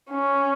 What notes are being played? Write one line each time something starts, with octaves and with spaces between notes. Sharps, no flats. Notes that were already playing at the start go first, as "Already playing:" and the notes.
C#4